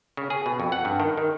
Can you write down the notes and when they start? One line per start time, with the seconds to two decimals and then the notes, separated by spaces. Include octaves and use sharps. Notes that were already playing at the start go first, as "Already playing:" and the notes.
0.17 C#3
0.30 G#4
0.46 B2
0.60 F2
0.72 F#5
0.85 G2
1.00 D#3
1.17 D#3